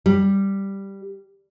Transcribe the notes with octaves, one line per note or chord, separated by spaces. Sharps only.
G3